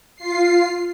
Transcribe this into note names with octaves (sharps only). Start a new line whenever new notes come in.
F4 C7